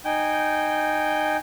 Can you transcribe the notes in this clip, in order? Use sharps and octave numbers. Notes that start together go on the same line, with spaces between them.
D#4 G5 G#5 G6